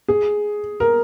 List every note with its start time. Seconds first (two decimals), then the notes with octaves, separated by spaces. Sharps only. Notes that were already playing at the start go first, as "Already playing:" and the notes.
0.08 G#4
0.80 A#4